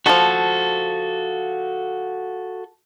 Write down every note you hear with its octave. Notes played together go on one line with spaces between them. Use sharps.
D#3 F3 F#4 A4